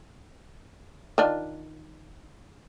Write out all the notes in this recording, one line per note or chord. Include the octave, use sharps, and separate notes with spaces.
D#3 D4 F4